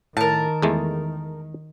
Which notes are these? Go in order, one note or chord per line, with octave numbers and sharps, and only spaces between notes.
A2 D#3 A#4 A5
E2 G#3 A3